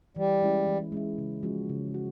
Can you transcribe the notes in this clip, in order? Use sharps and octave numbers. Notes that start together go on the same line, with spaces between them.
E3 G3
G#3 C#4 E4
E3
G#3 C#4 E4
C#3
F3 G#3 C#4 F#4
C#3
F#4